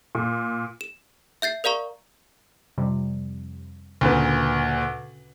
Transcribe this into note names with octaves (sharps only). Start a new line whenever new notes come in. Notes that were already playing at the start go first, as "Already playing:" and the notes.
A#2
E7
E5 G6 A6 C7
A#4 D5 F5 A#5 C#6
F2 C3 G3
D2 A#2 C#3 B4